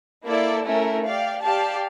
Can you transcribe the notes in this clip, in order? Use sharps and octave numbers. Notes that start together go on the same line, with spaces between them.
A#3 E4 A4 D5
A3 C#4 E4 A#4
G4 D5 F5
G4 D5 F5 A5